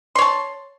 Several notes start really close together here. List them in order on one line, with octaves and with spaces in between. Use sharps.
C6 C#5 A5